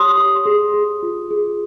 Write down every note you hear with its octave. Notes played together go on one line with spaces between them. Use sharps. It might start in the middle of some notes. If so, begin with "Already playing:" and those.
Already playing: G4 C#5 C6 D#6
G4
G#4
G#4
F4
G#4